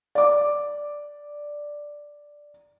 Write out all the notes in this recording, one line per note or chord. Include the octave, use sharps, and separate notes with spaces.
D5 D6